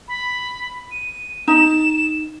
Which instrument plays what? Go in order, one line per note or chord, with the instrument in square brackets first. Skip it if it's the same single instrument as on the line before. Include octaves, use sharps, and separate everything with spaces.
[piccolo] B5
D#7
[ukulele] D#4 [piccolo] E7